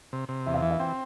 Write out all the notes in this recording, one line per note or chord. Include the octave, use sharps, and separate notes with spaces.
C3
C3
E2 E5
F5
E3 E5
F5
C4 G5